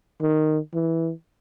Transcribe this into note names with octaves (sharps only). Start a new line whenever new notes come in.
D#3
E3